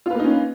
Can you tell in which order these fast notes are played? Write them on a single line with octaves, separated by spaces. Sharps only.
F4 B4 A#3 D#4 C#4